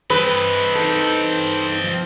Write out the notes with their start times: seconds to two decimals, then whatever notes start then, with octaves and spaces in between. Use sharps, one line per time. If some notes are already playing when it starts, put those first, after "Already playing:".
0.10 C4 B4 D#5
0.75 D#4 A4
1.84 F3